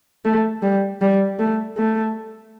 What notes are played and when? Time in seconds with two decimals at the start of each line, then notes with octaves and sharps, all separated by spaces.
0.25 A3
0.62 G3
1.01 G3
1.39 A3
1.77 A3